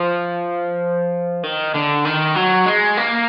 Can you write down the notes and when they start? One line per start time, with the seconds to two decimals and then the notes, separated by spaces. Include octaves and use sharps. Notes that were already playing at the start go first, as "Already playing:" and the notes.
Already playing: F3
1.43 D#3
1.74 D3
2.05 D#3
2.35 F#3
2.66 G#3
2.97 A#3